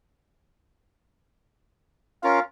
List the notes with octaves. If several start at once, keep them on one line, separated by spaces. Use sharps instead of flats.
C#4 F4 A#4 F5